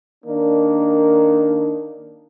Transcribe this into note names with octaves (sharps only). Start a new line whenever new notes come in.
D#3 A#3 D4